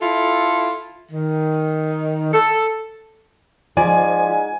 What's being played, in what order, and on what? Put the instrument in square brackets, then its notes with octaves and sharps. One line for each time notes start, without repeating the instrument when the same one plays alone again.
[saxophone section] E4 F4 A4
D#3
A4
[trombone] G#2 [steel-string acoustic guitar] F3 [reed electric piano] D5 [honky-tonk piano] G#5